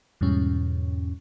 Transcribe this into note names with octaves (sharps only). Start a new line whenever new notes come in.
E2 G#2 B2 G3 C#4